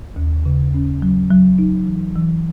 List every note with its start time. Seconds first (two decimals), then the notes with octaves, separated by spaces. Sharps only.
0.16 D#2
0.45 C#3
0.74 C#4
1.02 F#3
1.30 F#3
1.58 D#4
1.87 E3
2.16 E3